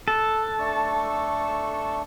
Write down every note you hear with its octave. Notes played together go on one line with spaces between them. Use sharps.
A4 F#6
A3 D4 C#6